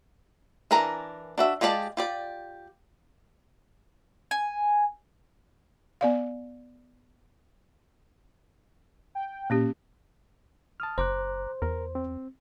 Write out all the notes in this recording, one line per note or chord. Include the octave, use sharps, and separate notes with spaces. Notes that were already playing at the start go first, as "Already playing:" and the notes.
E3 D4 A#4 G#5 A#5
D4 F#4 E5
G#3 F4 G4 D5 A5
F4 G4 D5
G#5
B3 D5 F5
G5
A#2 A#3 C#4 G4
A5 D#6 F6
F#1 C5 A#5 D6 F#6
E2 A#4
C4